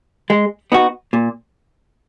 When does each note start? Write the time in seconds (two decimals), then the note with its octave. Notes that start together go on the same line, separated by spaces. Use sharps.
0.30 G#3
0.72 B3 D#4 F#4
1.13 A#2